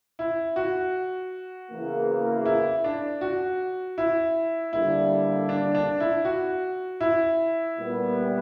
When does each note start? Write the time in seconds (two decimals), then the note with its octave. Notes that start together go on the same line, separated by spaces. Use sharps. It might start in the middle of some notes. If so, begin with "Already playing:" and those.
0.19 E4
0.56 F#4
1.70 E2 C#3 E3 A#3
2.45 E4
2.84 D4
3.21 F#4
3.98 E4
4.73 D3 G3 A#3 E4
5.49 D4
5.75 D4
6.00 E4
6.25 F#4
7.01 E4
7.77 A#2 G3 B3